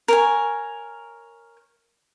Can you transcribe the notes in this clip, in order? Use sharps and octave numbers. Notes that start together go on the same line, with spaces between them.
A#4 C#5 G#5